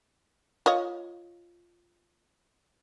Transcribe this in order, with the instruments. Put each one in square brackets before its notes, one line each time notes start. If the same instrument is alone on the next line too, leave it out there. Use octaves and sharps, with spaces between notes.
[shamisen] F4 C#5 D#5